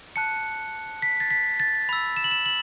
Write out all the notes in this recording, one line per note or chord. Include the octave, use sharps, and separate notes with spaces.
A5 F#6 C#7
B6
A6
B6
A6
B5 E6
E7
F#7
E7
F#7